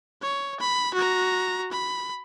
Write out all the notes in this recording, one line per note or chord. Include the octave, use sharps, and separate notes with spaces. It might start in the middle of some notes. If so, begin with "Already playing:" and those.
C#5
B5
F#4 A#5
B5